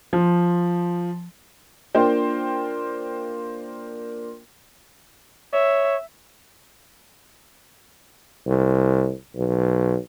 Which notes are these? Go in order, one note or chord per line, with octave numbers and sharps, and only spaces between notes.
F3
A#3 D4 F4 C5 G5
C#5 E5
C2
B1